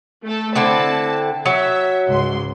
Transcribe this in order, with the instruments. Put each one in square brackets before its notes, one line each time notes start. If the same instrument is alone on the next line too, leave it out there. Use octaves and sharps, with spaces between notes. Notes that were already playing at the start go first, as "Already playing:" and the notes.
[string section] A3 A4
[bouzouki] D3 C4 E4 [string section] A5
[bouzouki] F#3 [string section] E5
[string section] C#2 G#2 C6